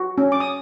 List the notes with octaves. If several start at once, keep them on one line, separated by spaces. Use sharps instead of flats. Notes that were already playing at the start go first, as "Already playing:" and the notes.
Already playing: F#4
C#4
D6
D#6